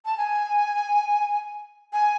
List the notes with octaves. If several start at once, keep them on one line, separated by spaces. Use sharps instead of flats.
A5
G#5
G#5